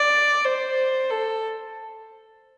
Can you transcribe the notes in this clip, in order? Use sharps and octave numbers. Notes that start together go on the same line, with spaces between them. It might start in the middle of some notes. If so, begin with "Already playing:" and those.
Already playing: D5
C5
A4